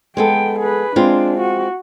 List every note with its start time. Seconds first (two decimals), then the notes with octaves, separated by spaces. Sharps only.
0.17 G#3 B3 A4 G5
0.59 G#4 B4
0.96 G#3 C4 D4 F4
1.40 F#4